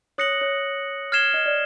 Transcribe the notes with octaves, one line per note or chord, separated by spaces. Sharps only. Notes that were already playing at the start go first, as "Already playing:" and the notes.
C#5 D#6 F#6 A#6 C#7 F#7
C#5
F6 G#6 C7 E7 G7
D#5
D5